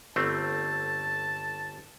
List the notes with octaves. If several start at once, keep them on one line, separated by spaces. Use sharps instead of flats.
G1 A3 C4 A5